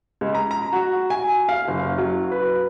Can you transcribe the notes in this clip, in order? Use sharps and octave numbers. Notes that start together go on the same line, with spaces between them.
C#2
A#5
A#5
F#4
G#5
F5
F#1
F#3
B4